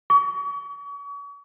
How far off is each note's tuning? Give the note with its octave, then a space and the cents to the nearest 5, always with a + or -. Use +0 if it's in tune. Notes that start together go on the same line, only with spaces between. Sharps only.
C#6 +40